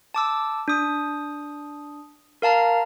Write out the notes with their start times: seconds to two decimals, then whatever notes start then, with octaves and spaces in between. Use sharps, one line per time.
0.14 A5 D6 E6
0.68 D4 D#6
2.42 A#4 F5 A5 A#5